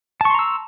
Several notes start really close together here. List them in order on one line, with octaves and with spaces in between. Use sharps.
A5 C#6 C6 A#5 E6